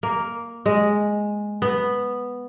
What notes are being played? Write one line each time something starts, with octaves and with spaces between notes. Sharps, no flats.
A#3
G#3
B3